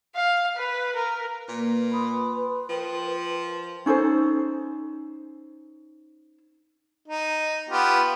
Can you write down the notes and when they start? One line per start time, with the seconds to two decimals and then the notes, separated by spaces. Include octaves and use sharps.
0.15 F5
0.56 B4
0.96 A#4
1.49 A#2 A#3 B4
1.91 B4 B5 C6 D#6
2.69 F3 A#4 G5
3.86 C#4 D#4 A4 C5
7.08 D#4
7.69 B3 F4 G4